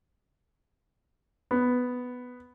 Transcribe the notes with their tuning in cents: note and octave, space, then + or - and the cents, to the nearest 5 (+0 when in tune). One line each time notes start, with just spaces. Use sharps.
B3 +5